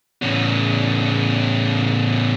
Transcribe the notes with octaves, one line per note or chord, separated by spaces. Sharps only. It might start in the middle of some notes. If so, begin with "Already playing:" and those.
A2 C#3